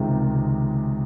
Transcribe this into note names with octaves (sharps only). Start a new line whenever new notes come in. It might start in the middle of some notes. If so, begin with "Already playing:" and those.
Already playing: C#2 C3 D#3 G#3